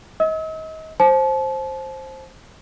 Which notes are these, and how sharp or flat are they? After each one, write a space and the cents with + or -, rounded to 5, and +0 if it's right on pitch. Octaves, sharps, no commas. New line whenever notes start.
D#5 +30 E6 -40
C5 +15 A5 -35